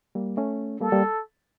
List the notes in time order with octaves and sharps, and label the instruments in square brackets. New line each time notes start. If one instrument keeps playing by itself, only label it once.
[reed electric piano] G3 A#3
A3 C#4
[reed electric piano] G3 A#3 [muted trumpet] A4
[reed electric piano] G3 A#3